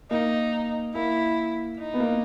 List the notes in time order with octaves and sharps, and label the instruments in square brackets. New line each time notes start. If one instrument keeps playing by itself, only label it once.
[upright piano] A#3 [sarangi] D#4
[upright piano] A#3 [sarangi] E4
[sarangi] D#4
[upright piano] B3
A#3